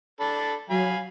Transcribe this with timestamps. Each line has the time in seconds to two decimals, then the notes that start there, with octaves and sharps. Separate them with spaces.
0.20 D4 A4 B5
0.70 F#3 F5 G#5 B5